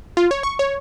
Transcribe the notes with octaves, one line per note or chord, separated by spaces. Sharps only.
F4
C#5
C#6
C#5